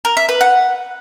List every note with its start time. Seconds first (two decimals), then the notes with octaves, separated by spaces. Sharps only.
0.05 A#4
0.17 E5
0.29 B4
0.41 F#5